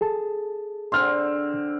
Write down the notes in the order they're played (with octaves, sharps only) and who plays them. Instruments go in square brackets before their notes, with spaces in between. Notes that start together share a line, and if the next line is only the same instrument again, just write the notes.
[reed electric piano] G#4 A4 A5
[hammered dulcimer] D3 C4 [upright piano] C6 F6